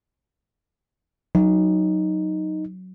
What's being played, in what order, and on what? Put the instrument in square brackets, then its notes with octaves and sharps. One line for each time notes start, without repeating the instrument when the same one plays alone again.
[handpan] F#3 [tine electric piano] D#4